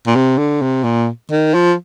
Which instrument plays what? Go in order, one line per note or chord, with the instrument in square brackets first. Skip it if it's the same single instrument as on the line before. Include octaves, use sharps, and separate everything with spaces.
[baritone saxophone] A#2
C3
D3
C3
A#2
D#3
F3